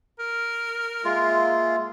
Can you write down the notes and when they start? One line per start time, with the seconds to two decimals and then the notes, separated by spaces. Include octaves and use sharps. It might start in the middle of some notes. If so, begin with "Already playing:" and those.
0.19 A#4
1.04 G#3 A#3 F4 E5